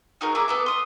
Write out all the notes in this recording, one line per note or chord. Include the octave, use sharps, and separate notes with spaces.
D#4 F#4 G#4 A#4
E4 G#4 A#4 D6
B3 A4 D6
C6 D#6